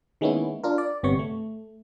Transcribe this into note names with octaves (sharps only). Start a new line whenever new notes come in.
D#3 G#3 A#3 B3 C#4 E4
D4 F4 A#4
D5
G1 C3 B3 C#5 C#6
A3